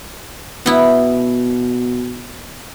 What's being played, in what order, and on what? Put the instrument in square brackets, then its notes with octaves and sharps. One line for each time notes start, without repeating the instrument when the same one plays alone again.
[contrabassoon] B2 [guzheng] B3 E4